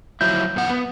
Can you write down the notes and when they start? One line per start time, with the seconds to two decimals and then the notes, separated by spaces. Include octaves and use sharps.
0.21 F3 F#3 E4 G6
0.56 F#2 B3 F#5
0.69 B3